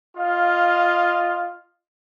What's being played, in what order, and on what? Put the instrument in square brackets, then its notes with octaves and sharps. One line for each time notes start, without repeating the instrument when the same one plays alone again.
[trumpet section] F4 D#5 F5